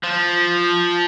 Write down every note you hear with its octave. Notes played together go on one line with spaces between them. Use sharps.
F3